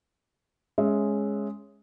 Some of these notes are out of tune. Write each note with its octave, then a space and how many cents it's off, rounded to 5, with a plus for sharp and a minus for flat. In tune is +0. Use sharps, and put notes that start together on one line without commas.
G#3 +0 C#4 +0 E5 -5